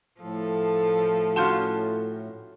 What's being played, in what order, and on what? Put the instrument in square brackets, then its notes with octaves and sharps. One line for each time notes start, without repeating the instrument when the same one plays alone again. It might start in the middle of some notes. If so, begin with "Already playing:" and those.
[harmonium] A2 [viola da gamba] F3 A4
[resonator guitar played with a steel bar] C#4 F4 F#4 [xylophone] A5 C6 G6